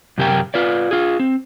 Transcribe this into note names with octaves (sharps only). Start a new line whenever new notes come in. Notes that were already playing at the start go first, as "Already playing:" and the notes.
F#2 C3 G4 A#4 G5
F4 B4 D5
F4 G#4
C4